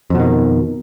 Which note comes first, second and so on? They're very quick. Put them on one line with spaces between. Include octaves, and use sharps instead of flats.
F2 B2 D#3